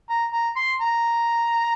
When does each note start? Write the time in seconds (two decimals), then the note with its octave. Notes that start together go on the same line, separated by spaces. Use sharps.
0.10 A#5
0.33 A#5
0.56 C6
0.81 A#5